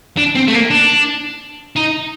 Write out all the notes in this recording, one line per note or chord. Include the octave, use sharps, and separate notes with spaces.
D4
C4
A3
A#3
D4
D#4